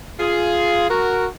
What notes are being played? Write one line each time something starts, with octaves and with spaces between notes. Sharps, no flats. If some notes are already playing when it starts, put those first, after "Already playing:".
F4 G#4
F#4 A#4